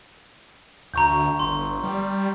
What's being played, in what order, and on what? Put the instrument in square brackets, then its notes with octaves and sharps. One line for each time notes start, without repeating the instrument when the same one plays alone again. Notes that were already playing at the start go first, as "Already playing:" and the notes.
[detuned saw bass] D2 [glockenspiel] A#5 C#6 G6
[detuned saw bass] G1 [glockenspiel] C6
[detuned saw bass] G3